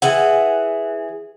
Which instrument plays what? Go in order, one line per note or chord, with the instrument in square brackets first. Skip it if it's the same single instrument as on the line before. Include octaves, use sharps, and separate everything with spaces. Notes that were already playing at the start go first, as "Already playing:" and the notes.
[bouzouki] E3 G#4 F#5